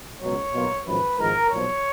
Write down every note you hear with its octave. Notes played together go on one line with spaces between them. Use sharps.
C#2 B2 F#3 C#5
B1 B2 A#3 F4
G#1 F#2 F3 B4
G#1 G#2 F3 A#4
B1 A#2 F3 C#5